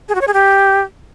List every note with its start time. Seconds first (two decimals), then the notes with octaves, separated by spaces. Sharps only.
0.09 G#4
0.15 F#4
0.21 C#5
0.27 G#4
0.33 G4